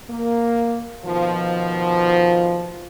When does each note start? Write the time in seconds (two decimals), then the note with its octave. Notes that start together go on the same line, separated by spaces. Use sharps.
0.10 A#3
1.05 B2 D#3 F3